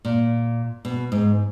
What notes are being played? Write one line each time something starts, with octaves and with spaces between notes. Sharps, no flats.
A#2
B2
G#2